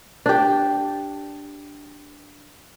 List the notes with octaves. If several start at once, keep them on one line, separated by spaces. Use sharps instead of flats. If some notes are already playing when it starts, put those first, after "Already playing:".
D4 G4